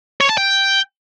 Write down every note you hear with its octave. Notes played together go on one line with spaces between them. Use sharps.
C#5
A5
G5